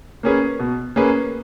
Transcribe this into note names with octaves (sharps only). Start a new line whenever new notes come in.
A#3 C#4 G#4 B4
B2
A#3 C#4 G#4 B4